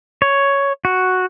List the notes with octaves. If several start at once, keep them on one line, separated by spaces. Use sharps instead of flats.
C#5
F#4